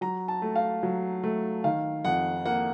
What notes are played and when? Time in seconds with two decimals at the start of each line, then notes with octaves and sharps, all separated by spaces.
0.01 F#3 A#5
0.28 A5
0.42 A3
0.56 F5
0.83 F#3
1.24 A3
1.64 D#3 F5
2.05 F2 F#5
2.46 A#3 F#5